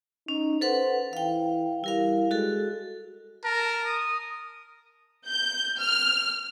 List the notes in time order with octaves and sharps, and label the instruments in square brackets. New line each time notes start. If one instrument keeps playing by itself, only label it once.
[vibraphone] C#4 [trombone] D#4
[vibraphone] A4 B4 F#5 [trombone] C5
[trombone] E3 [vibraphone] F5 G5
[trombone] G3 [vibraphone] E4 A#4 F5
[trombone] G#3 [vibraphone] F#4 A4
[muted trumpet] A#4 [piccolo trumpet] A5
[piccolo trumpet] D#6
[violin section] G6
F6